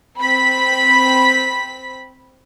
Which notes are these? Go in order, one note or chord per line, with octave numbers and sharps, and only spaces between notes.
C4 B5 B6